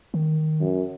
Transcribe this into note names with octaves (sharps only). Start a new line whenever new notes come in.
D#3
F#2